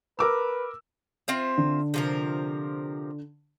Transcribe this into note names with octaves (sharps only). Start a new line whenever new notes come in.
A#4 B4 D6 E6
C4 F4 E5
D3
C3 F3 A#4